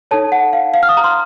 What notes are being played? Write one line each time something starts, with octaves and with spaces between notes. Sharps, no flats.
D#4 A4 C#5 A5
F#5
F5
F5
F6
D#6
A#5
C6